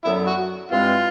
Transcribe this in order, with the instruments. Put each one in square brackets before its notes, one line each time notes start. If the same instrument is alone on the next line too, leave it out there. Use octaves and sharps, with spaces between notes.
[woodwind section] F#2 D3 F#3 B3 [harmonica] E4
[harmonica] F#4
[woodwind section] G2 E3 G#3 C4 [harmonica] F4